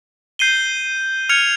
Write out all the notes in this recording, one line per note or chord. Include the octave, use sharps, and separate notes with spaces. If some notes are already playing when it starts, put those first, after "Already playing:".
G6 C7 D#7 G7
F6 G#6 C#7 F7